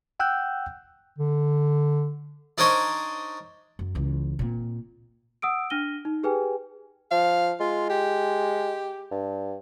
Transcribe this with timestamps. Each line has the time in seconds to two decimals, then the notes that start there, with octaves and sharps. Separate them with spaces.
0.20 F#5 G5 E6 F#6 G6
1.18 D3
2.58 D4 D#4 A#4 C5 C#5 D#5
3.79 F#2
3.95 C#2 E3
4.39 A#2 C4
5.42 F#5 D#6 E6 D7
5.70 D4 F6 A#6 D#7 G7
6.05 D#4
6.23 G4 G#4 B4 G5 G#5
7.11 F3 F5
7.60 G#3 F4
7.90 G4
9.11 G2